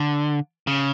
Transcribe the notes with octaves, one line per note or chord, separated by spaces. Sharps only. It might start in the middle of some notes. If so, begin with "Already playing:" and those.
Already playing: D3
C#3